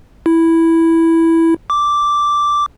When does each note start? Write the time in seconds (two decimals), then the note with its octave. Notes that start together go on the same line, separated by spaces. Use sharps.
0.26 E4
1.70 D6